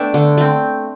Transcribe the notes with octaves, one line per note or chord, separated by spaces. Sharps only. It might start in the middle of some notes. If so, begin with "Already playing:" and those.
Already playing: A3 B3 D4 E5 G5
D3
A3 C4